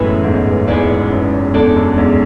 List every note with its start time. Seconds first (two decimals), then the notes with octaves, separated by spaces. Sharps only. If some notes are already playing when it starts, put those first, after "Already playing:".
Already playing: F#2 A2 E3 G#3 B3 E4 B4
0.24 E2 G#2
0.68 E2 G#2 G#3 B3 E4 B4 D5
1.10 F#2
1.54 E2 G#3 D4 A4 D5
1.76 F#2
1.97 E2 G#2